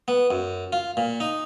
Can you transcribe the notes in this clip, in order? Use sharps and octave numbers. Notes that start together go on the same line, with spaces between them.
B3
F#2
F4
A#2
D#4